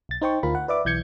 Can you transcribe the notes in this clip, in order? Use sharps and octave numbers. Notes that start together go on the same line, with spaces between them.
B1 A6
D#4 C5 G5 C#6
D2 F4 A#4 B5
F#5
B4 D5 E5 D6
B1 E3 G6 G#6 C#7